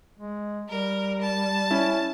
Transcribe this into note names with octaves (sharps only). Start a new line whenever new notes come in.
G#3
G3 A#4
A5
C#4 E4